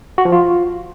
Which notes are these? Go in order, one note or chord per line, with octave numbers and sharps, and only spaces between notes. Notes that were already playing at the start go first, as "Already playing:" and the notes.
F#4
F3
F4